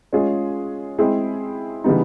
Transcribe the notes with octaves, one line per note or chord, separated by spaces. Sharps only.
G#3 C#4 F4 G#4
G#3 C4 E4 G#4
C#3 E3 G3 B3 D#4